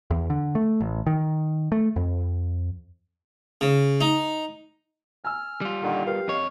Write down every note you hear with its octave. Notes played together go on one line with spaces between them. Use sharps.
E2
D3
A3
A1
D#3
A3
F2
C#3
D#4
G#5 E6 F6
G3 F4
A#2 D3 D#3
G4 A#4 B4 F5
F2 C#5 D#5